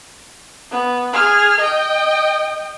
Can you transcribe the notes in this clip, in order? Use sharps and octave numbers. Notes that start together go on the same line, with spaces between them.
B3
G#4 F6
D#5 G5